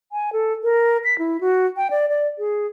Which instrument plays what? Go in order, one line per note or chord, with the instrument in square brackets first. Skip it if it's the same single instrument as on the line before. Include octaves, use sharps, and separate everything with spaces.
[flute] G#5
A4
A#4
B6
E4
F#4
G5
D5
D5
G#4